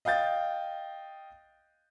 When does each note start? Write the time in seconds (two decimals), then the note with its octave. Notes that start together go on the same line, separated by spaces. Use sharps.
0.05 D#5 F5 G5 G6 A6